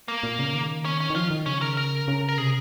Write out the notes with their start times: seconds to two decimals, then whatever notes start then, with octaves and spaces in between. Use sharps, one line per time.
0.08 A#3
0.23 A#2
0.39 C#3
0.54 D#3
0.85 C#4
1.00 C#4
1.10 D#3
1.15 F3 F4
1.31 D#3
1.46 C#3 C#4
1.61 A#4
1.77 A#4
2.08 C#3
2.29 A#4
2.38 C3 G#4